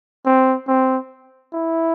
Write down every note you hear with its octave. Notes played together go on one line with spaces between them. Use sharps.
C4
C4
E4